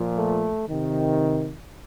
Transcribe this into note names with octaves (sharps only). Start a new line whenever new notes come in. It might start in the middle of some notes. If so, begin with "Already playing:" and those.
Already playing: A#2 F3
A3
C3 D#3